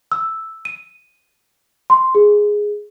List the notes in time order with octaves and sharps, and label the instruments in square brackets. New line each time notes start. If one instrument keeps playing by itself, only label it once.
[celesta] E6
D#7
C6
G#4